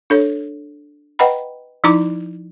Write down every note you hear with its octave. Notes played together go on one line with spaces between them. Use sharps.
D4 A4 C#5
B4 D#5 F#5 G5 A#5 B5
F3 D#4 E4 A#5 D6